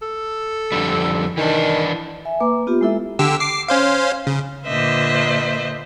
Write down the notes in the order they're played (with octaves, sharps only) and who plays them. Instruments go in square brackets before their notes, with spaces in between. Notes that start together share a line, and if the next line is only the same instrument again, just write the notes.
[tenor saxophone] A4
[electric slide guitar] F2 D3 G3
[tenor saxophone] D#3 [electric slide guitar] E3 D4
[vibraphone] E5 G#5
A#3 B4 D6
B3 F4 G4
G#3 A#3 E4 A4 E5 E6
[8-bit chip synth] D3 G4 E6
D6 C7
C#4 C5 F5
C#3
[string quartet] A#2 D3 B4 C5 D#5 E5